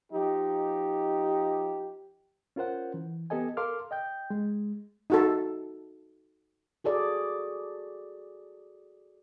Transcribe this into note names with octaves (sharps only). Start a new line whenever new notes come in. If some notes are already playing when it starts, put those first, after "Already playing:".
F3 D#4 G4
C#4 F4 A#4 C5 F#5
E3
B3 G4 A4 D#5 G#5
A4 A#4 F5 C6 D6 F6
D#5 G5 G6
G#3
D#4 F#4 A4
F#4 G#4 A4 D5